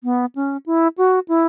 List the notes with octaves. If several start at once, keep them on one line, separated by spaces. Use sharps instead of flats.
B3
C#4
E4
F#4
E4